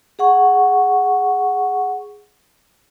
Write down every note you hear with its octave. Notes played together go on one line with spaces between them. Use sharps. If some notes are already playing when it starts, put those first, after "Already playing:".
G#4 F#5 C#6